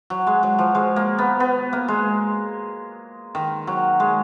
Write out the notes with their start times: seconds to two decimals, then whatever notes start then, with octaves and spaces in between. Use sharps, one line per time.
0.10 F#3
0.27 G#3
0.43 F#3
0.58 F3
0.75 G#3
0.96 A#3
1.18 B3
1.40 B3
1.73 A#3
1.88 G#3
3.35 D#3
3.67 F#3
4.00 G#3